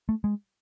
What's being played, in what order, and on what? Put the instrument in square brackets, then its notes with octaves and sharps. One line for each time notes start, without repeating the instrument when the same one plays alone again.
[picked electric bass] A3
G#3